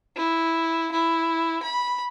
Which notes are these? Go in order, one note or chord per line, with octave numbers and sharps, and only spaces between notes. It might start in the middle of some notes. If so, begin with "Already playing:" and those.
E4
E4
B5